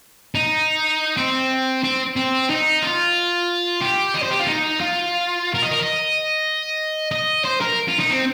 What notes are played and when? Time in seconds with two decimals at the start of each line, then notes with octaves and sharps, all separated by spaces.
0.35 D#4
1.17 C4
1.84 C4
2.17 C4
2.50 D#4
2.82 F4
3.81 G4
4.15 D#5
4.23 C5
4.31 G4
4.40 F4
4.47 D#4
4.81 F4
5.54 A#4
5.62 D#5
5.71 A#4
5.80 D#5
7.11 D#5
7.45 C5
7.61 A#4
7.89 F4
8.00 D#4
8.11 C4